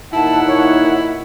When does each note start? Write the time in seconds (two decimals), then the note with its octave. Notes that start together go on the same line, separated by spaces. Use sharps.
0.13 D#2 A#2 E3 D#4 E4 F#5 A5
0.48 C#5